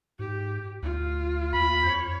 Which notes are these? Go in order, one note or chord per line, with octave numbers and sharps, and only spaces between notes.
G#2 G4
D2 F4
D#2 B5
F2 C#5